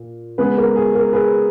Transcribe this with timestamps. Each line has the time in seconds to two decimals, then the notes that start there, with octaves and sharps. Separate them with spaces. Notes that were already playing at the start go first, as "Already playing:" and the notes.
Already playing: A#2
0.38 C#3 G#3 B3 G#4 B4
0.58 A#4
0.76 G#4
0.95 A#4
1.13 G#4 B4